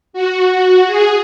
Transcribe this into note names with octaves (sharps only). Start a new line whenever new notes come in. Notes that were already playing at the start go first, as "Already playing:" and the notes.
F#4
G#4